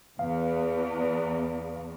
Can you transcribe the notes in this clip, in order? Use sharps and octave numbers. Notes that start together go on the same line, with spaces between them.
E2 F5